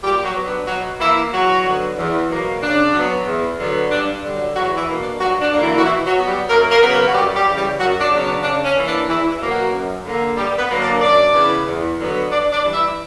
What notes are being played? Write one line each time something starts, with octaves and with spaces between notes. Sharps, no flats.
A#2 G3 G4
G4
F#3 F#4
F#3 B3
D4
B2 F#3 F#4
E3 A#3 E4
E2 F#3 F#4
D3 F#3 B3
E2
B2 F#3 A#3
C#3 D4
F#3 B3
E2
D3 F#3 B3
G2 D4
D3 G3
F#3 F#4
E2 F#3 F#4
E3 E4
B2 A#3
D4
G2 F#3 F#4
D4
D3 F#3 A#3
E3 E4
F#4
B2 E3 E4
F#3 F#4
F#3 B3
G3 G4
F#2 A#3 A#4
A#3 A#4
C#3 F#3 B3 B4
A#3 A#4
F#4
F#2 G3 G4
G3 G4
C#3 E3
G3 G4
F#2 F#3 F#4
D4
C#3 F#3 B3
D4
C#3 D4
C#4
E3 A#3
D4
E2 E3 E4
E3 E4
B2 F#3 A#3
F#3 F#4
F#2
D3 A#3
G2 G3 G4
B3 B4
D3 F#3 A#3
D4 D5
F#2 D4 D5
C#3 E3 B3
E2
D3 F#3 B3
G2 D4 D5
D4 D5
E3 G3
E4 E5